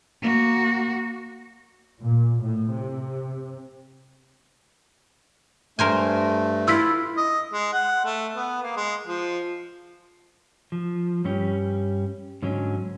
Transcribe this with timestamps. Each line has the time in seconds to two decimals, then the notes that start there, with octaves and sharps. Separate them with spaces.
0.22 A#3 F#4
2.01 A#2
2.41 A2
2.71 C3
5.79 G2 A3 A#4 C5 G#5
6.68 E4 F4 E6 B6
7.17 D#5
7.53 G#3
7.73 F#5
8.04 A3
8.35 B3
8.62 A#3
8.76 G#3
9.07 F3
10.72 F3
11.24 G2 G3 C#4 G4
12.42 G#2 D3 F#3 C#4